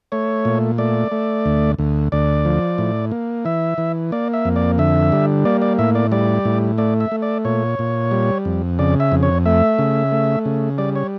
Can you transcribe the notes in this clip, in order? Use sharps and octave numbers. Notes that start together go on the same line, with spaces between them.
A3 C#5
A#2
A3 D5
A3
D2
D2
D2 D5
F3
A2
A#3
E3 E5
E3
A#3 D5
E5
F2
D5
D3 E5
G3
A#3 D5
D5
A2 E5
D5
G3 D5
A2
A3 D5
E5
A3
D5
A#2 C#5
A#2
G3
F2
C#3 D5
E5
F2
C#5
A3 E5
C#3
A3
C#3
G3 D5
C#5